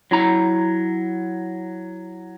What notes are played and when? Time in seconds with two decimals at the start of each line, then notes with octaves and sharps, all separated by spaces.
0.11 F#3 E4 A#5